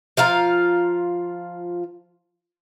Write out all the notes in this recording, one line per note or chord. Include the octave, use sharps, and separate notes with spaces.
F3 F4 F5 A#5